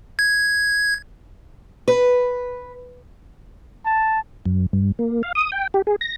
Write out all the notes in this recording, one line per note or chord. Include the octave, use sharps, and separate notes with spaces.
G#6
B4
A5
F#2
G2
A#3
F5
D#6
G5
G4
G#4
A#6